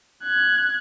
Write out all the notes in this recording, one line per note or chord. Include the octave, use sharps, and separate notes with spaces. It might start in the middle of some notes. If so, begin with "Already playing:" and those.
F#6 G#6